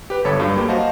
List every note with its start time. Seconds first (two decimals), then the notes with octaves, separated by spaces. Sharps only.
0.10 G4 B4
0.25 G1 A4 C#5 B5
0.38 G2 F#3 F4
0.56 A#3 G4
0.68 F#4 C5 D#5 F5 A5